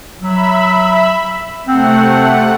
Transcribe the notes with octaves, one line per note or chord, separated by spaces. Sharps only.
F#3 E5 B5
C3 A3 C4 F#5